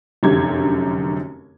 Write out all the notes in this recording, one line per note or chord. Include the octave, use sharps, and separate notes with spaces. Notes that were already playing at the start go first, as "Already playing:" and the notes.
F1 F#2 D3 G4 G#6